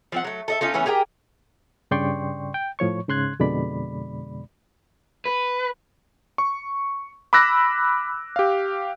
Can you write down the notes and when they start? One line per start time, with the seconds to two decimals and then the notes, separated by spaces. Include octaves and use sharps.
0.12 F3 C4 F#5
0.24 F#3 A3
0.48 A4 D#5 E5
0.61 C#4 D#4 F4 A4
0.74 E3 A3 B3 C#4
0.86 G4 G#4 A#4 G5
1.91 G2 C#3 D5 G5 C6 C#6
2.54 G5
2.79 A2 F3 C#5 C#6
3.08 G#2 C#3 C6 F#6 G#6
3.40 F2 B2 D3 G#3 D5 B5
5.25 B4
6.38 C#6
7.33 B5 D6 E6 F#6 A#6
8.36 G4 F5